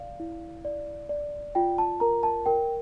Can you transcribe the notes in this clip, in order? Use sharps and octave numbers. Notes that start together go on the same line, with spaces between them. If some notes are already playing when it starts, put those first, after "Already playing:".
Already playing: D5 F5
E4
D5
D5
F4 G5
A5
A#4 A#5
A5
A#4 G5